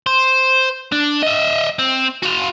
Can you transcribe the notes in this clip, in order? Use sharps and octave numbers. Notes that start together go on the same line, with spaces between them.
C5
D4
D#5 E5
C4
F#4 F5